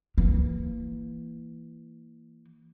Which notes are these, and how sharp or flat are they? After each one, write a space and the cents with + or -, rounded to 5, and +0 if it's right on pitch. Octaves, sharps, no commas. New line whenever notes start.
E3 +0 A#3 -15